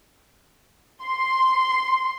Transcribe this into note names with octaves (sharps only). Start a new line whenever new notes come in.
C6